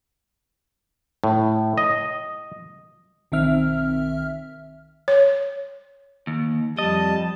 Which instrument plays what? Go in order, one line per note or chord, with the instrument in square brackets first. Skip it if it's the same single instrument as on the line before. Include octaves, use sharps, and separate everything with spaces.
[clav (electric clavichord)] A2
D#5
[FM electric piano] B1 D#3 C4 E5 F6
[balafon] C#5
[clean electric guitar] D#2
[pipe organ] F2 G3 A5 [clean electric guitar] D#5